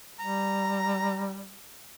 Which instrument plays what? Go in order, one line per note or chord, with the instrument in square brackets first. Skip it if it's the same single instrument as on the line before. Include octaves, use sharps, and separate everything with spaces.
[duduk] G3 [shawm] A#5